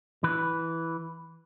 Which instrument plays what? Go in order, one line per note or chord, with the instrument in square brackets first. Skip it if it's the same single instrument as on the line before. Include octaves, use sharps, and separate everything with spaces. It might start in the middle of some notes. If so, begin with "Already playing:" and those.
[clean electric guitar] E3 B4